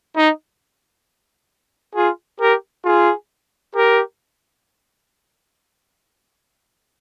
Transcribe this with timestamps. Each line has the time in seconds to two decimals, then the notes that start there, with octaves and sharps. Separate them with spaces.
0.17 D#4
1.95 F4 G#4
2.41 G4 A#4
2.85 F4 G#4
3.75 G4 A#4